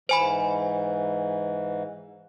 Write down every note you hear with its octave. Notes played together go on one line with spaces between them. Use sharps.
G#2 E3 C5 G#5 B5